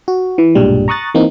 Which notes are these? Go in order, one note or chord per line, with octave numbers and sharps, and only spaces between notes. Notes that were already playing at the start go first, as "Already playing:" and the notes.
F#4
E3
B1 G2 A#2 G3 G#3
A#5 C#6 D#6 F#6 A6
E3 A#3 C4 D#4